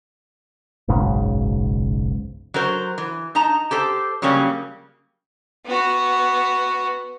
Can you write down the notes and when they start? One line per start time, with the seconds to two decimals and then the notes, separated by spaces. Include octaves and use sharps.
0.88 F#1 B1 G#2 C#3
2.54 F#3 F#4 A#4 C5
2.98 E3
3.35 D#4 A5 A#5
3.71 G4 A4 C5
4.22 C#3 F#3 G3 A#3 C#4
5.65 B3 F#4